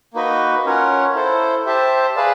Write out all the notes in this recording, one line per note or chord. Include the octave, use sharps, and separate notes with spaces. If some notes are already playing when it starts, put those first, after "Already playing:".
A#3 D#4 F#4 B4 D#5
C#4 F4 A#4 C#5 F#5
E4 A4 C5
G4 C5 E5 A5
G#4 B4 D5 F5 A5